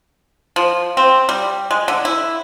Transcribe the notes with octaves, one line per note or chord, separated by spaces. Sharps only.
F3
C4
G3
G#3
D3
E4